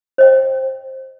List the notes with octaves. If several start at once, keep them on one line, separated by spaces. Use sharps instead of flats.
C5 D#5 G5